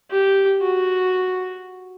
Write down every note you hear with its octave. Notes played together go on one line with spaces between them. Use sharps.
G4
F#4